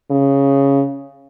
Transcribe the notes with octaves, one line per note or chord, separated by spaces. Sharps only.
C#3